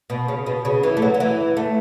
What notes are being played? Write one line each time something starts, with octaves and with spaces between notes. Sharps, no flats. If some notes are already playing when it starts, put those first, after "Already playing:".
B2
C#3
B2
C#3
E3
A3
F#3
F#3
E3
A3